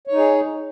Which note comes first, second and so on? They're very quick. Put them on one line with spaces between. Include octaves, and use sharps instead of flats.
C#5 D#4 G#4